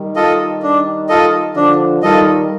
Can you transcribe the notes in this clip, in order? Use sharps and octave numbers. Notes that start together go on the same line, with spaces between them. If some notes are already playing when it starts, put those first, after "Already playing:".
Already playing: D#3 G3
F4 A4 D#5
D4
F4 A4 D#5
D3 F3 D4
D#3 G3 F4 A4 D#5